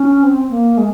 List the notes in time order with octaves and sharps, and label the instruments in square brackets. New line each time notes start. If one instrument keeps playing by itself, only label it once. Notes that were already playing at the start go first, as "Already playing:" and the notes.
Already playing: [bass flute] C#4
C4
A#3
G#3